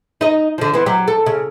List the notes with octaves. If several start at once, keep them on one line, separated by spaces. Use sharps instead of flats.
D#4 D#5
D3 F3
E3 B3 C4
F#3 G4
A4
C#3